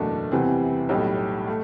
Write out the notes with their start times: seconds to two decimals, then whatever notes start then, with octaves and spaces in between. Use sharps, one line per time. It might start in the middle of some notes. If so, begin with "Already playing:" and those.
Already playing: F#1 E2 B2 A3 D4
0.32 E2 C3 E3 G3 C4
0.89 B1 A2 G3
1.48 A3